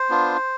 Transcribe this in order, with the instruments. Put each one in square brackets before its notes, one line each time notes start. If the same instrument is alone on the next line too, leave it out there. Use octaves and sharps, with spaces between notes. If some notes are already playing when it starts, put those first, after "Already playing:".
Already playing: [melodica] C5
B3 D4 F4